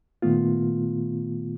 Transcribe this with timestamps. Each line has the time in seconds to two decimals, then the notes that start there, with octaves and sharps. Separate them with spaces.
0.22 A#2 D#3 A3 B3 F4